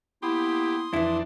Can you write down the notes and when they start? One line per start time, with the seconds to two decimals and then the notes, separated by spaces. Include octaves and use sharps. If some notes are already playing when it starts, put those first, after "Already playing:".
0.22 A#3 B3 E4 G4 C6 D#6
0.93 F2 E3 D4 E4